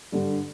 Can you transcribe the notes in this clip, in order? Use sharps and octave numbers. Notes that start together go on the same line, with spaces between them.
G2 D3 G3